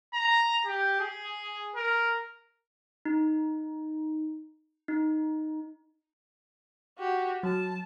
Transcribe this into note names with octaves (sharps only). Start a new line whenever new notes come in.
A#5
G4
G#4
A#4
D#4
D#4
F#4 G4
F#3 A5